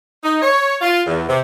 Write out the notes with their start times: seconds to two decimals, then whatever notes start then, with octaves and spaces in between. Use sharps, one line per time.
0.23 D#4
0.41 C#5
0.81 F4
1.07 E2
1.27 C3